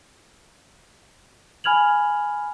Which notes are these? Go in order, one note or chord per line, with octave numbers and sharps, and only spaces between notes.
G#5 B5 F6 G#6 F7 F#7